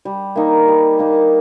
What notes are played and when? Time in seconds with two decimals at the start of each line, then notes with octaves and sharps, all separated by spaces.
0.05 G3
0.36 A#3 D#4
0.68 G3
0.99 A#3 D#4